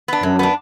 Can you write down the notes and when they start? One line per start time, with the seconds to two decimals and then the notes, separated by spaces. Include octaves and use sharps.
0.08 B3 D4
0.23 F#2 F#3
0.39 B3 D4